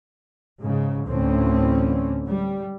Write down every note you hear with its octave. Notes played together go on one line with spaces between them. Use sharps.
G#2 C#3
D2 A2 D3 E3 C4 C#4
G3